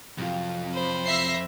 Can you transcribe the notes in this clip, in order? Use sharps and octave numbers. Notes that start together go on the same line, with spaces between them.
F2 C3 F#3 F4
C5 B5
E5 A#6 C7